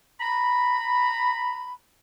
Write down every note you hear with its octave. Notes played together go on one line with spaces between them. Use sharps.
A#5 B5